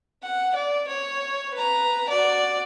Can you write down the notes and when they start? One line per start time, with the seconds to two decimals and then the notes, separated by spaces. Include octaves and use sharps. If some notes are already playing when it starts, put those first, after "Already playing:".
0.23 F#5
0.55 D5
0.88 C#5
1.54 B4 A#5
2.09 F#4 D5